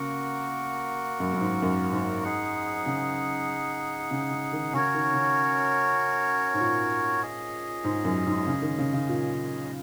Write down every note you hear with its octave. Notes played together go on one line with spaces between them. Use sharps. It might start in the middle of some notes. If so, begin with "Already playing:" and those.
Already playing: C#3 A#3 F#4 A#4 F#5
F#2
F#2
G#2
F#2
G#2
D#4 G#4 F#5
C#3
C#3
C#3
D#3
C#3 C#4 F#4 A#4 C#5
D#3
C#3
G#2
A#2
C#4 G#4 D#5
G#2
F#2
G#2
C#3
D#3
C#3
C#3
A#2